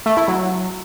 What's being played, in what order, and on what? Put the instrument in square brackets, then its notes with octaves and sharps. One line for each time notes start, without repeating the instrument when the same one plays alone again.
[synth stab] A3
E4
F#3